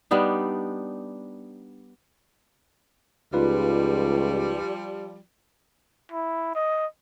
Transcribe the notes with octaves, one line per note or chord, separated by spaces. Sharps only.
G3 B3 D4 D#4
C#2 F3 G3 D#4 F4 B4
E4
D#5